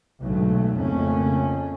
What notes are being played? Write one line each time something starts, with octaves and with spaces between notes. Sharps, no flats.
B1 G#2 D3 F#3 A3
F2 C#3 A3 A#3 C#4